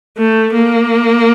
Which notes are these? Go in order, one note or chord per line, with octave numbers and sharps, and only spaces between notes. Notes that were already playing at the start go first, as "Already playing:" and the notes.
A3
A#3